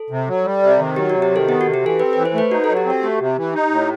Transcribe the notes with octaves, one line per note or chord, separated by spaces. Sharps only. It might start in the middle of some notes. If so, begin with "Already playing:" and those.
Already playing: A4
C3
F#3
G3
C3
D#3
F#3 G4
C3 F#4
G4
D#3 A4
B3 G4
F#4
C3
G4
E3 A4
C4 B4
E3 B4
C5
A3 B4
D#4 F#4
F#3 A4
G4
C4 F#4
A3 G4
C3
E3
D#4
A2